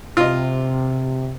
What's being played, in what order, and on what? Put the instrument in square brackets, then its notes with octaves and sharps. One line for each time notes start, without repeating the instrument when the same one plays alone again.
[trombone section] C3 [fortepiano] F4 D#5